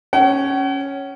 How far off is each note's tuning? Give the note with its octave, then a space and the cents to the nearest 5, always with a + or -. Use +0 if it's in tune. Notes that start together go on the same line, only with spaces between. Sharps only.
C#4 +0 F#5 +45